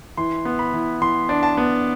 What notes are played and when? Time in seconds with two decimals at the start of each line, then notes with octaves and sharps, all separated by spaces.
0.17 E3 C6
0.45 B3
0.59 B5
0.73 E3
1.01 E3 C6
1.29 D4
1.43 A5
1.57 B3